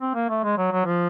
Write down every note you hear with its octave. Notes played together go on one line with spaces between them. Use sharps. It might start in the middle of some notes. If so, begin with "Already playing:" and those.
C4
A#3
A3
G#3
F#3
F#3
F3